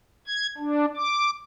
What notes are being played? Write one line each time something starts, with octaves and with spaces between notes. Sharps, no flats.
G#6
D4
D6